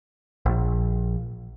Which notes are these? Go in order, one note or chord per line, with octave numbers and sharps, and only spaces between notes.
A#1